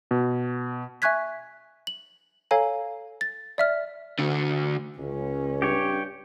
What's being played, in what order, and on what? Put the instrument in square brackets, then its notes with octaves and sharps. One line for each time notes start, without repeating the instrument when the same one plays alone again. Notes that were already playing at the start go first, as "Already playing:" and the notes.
[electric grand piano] B2
[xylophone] E5 G#5 C#6 F#6 G#6 B6
F#7
A4 C#5 F5 G#5 A#5 C7
A6
D5 E5 F6
[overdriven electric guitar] D2 D3
[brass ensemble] C#2 [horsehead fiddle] C#4
[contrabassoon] G2 [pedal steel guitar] G4 C#5